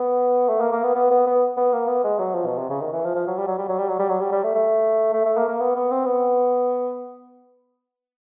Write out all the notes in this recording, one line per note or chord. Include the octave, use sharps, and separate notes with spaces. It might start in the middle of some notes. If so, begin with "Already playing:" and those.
Already playing: B3
A3
A#3
A#3
B3
B3
B3
B3
B3
A#3
B3
G#3
F#3
F3
B2
C3
C#3
D#3
E3
F3
F3
F#3
G3
F#3
G3
F#3
G3
F#3
G3
F#3
G3
G3
A3
A3
A3
A3
A#3
A#3
B3
B3
C4
B3